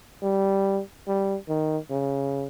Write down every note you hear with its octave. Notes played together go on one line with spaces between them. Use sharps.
G3
G3
D#3
C#3